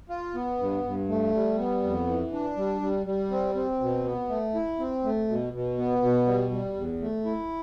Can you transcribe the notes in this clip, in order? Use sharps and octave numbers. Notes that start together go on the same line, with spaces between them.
F4
B3
G2
G2
A3
G3
B3
F2
E3
D4
G3
G3
G3
C4
C4
B2
B3
A3
E4
C4
A3
B2
B2
B3
B2
G3
G3
E2
A3
E4